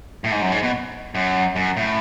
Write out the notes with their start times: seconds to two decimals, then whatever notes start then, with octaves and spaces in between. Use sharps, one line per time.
0.24 A2
0.31 G#2
0.41 F#2
0.52 G#2
0.63 B2
1.15 F#2
1.56 F#2
1.77 A2